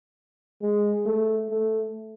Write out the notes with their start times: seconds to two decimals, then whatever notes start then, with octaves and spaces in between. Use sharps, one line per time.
0.62 G#3
1.05 A3
1.50 A3